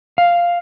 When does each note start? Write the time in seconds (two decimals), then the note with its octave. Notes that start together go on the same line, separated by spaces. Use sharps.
0.18 F5